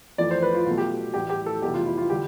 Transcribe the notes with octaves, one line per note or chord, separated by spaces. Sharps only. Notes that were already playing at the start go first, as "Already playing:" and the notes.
F2 E3 A3 D5
C5
B4
F4
B1 B2 A3 F4
G4
A1 A2 G3 G4
G4
A4
F1 E2 B2 G3 G4
F4
E4
F4
D3 G3 G4